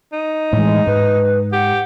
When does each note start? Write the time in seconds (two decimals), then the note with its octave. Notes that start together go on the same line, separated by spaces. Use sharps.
0.13 D#4
0.53 A2 E3 G#3
0.87 G#2 B4
1.53 G4 F#5